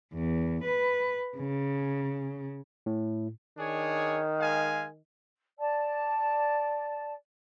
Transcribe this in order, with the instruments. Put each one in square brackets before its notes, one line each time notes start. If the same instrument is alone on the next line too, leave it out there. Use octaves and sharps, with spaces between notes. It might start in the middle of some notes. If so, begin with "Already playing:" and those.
[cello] E2
B4
C#3
[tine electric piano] A2
[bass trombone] D#3 [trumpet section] D4 G#4 C#5
[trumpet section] G#3 F5 G#5
[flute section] D5 A5